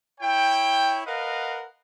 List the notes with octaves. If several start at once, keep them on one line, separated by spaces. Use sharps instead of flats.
E4 C#5 G5
A#4 B4 D#5 F5 F#5